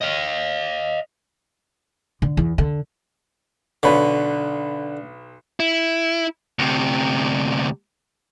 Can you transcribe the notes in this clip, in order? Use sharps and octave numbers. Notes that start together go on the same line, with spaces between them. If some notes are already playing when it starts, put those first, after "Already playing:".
D#5 F5
D3
E2
D3
B1 D3 B4 C#5
E4
D2 C3